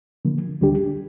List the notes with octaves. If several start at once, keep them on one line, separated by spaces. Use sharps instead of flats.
D3 F3 A#3
D2 D3 G3 D4 G4